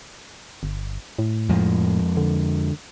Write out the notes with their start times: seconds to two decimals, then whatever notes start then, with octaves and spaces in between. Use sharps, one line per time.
0.63 G1
1.19 A2
1.49 F2 F3 G#3
2.17 D3